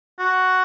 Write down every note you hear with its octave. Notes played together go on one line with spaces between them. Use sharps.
F#4